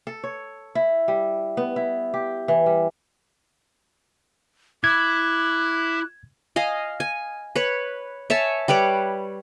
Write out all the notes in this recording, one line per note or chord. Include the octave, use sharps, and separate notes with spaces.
A4
C#5
E4
G3
B3
E4
G4
E3
G3
E4 D6 F#6 G#6
D#5 F5 G#5
G#5
B4 C#5
C#5 E5 G#5 A5
G3 B4 C#5 D6